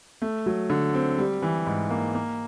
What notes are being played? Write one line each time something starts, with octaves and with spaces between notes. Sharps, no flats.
A3
F#3
D3
C4
G3
E3
G#2
A#3
A#3